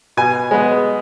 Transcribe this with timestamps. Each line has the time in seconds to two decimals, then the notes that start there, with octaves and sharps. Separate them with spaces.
0.17 B2 G#5
0.51 G#3 B3